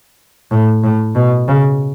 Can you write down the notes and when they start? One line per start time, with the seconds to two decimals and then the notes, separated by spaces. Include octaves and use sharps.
0.51 A2
0.84 A2
1.15 B2
1.48 C#3